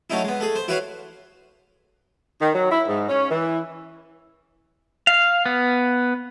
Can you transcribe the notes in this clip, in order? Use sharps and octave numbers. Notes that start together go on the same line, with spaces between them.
F#3 A3 C#4 D#4 E4
G#3 B3
A3 G#4
C5
E4 F#4 B4 C#5 F5 F#5
D#3
F#3
E4
G#2
C#4
E3
F5
B3